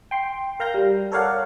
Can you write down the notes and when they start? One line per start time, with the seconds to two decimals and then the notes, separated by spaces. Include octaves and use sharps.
0.11 G5 C6
0.60 A#4 F5 A#5 G6 A#6
0.74 G3
1.12 A4 A#4 C#5 D5 F5 F#5